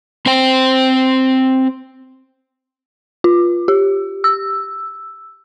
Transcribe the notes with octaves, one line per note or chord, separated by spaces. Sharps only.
C4 C5 G5
F4
G4
E6